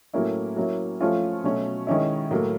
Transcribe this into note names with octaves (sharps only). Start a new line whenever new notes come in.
A2 F#3 A#3 C#4 E4
F#3 A#3 C#4 E4
F3 A3 C#4 F4
B2 F#3 A3 C#4
D#3 G#3 C#4 E4
A2 F#3 A#3